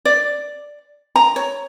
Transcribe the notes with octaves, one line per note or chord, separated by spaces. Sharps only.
D5
A#5
C#5